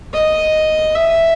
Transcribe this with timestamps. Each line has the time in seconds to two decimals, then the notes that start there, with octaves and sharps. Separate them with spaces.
0.13 D#5
0.95 E5